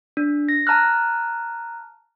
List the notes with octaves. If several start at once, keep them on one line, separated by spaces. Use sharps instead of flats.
D4
A#6
A5 A#5 F6 F#6